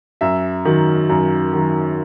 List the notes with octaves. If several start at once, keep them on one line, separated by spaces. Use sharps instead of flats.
F#2 E5
D#3 F#3
F#2
D#3 F#3